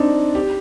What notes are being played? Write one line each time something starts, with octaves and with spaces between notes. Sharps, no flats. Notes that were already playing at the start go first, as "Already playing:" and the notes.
Already playing: C4 D4 D#4
G4